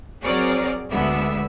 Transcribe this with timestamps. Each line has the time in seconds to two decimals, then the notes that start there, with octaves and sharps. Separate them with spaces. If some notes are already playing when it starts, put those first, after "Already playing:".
0.23 F#3 C4 G#4 A#4 C#5 D5
0.90 D2 D3 G#3 B3 E5